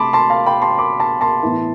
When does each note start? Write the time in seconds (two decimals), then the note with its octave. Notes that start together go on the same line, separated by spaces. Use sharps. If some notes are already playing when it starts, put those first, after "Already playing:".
Already playing: C3 A3 A5 B5 C6 D6
0.13 A5 C6
0.30 F5 A5
0.46 G5 B5
0.62 A5 C6
0.78 B5 D6
1.00 A5 C6
1.21 A5 C6
1.42 A2 E3 B3 E4